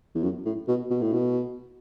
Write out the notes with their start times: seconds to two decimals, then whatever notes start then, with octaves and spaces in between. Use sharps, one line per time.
0.15 E2
0.23 F#2
0.45 A2
0.68 B2
0.90 B2
1.02 A2
1.13 B2